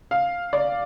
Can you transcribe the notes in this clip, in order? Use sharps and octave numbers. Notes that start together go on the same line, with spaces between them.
F5
D5